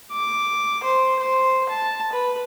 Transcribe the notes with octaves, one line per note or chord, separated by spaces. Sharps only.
D6
C5
C5
A5
B4